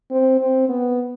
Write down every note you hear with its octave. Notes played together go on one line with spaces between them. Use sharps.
C4
C4
B3